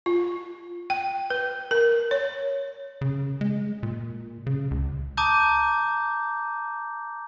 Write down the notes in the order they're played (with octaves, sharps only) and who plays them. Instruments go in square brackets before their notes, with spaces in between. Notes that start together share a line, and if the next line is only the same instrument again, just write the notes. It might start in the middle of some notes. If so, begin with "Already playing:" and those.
[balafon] F4
G5
B4
A#4
C#5
[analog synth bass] C#3
G#3
A#2
C#3
C#2
[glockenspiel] A5 A#5 D6 D#6 G6